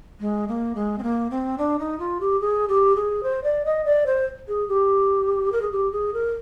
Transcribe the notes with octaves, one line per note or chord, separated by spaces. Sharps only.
G#3
A#3
G#3
C4
A#3
C4
D4
D#4
F4
G4
G#4
G4
G#4
C5
D5
D#5
D5
C5
G#4
G4
A#4
G#4
G4
G#4
A#4